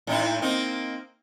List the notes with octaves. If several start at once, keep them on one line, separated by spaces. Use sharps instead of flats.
A2 D#4 E4
A#3 C4 D#4